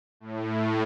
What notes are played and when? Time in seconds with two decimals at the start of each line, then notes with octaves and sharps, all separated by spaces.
0.20 A2